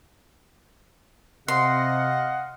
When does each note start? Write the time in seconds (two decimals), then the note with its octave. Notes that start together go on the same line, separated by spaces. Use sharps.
1.48 C3 D#5 F5 F#5 C6